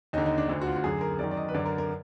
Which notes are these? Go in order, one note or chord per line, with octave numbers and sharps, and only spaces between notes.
D#2 D3 D#4
D#4
D4
D2 D3
F#4
F4
F#4
F#2 D3 G#4
A#4
F#2 D#3 D5
D5
D#5
B4
F#2 D3 D5
A#4
A#4